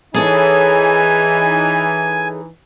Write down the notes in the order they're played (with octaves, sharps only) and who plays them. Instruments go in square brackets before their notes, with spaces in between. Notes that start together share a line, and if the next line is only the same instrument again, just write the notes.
[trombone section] E3 D#4 [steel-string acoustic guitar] G#4 A4 C#5 [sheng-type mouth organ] G#5